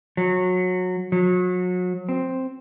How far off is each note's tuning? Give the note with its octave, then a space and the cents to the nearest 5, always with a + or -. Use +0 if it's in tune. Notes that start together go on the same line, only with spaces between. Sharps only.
F#3 -20
F#3 -35
C4 +0